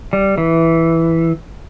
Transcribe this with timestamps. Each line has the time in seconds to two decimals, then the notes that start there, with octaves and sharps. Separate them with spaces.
0.13 G3
0.38 E3